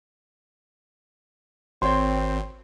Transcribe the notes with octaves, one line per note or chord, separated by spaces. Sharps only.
G#1 C4 C5 C#5 G5 C6